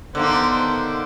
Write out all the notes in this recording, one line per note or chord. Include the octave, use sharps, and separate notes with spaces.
D3 D#3 A#3 B3 C5